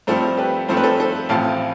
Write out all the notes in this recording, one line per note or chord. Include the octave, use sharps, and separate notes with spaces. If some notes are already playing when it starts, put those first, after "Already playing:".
G2 F3 A3 C4 A4 C5
G4 B4
G2 F3 A3 C4 C5
B4
A4 C5
A4 C5
A1 A2 F3 C4 F5 A5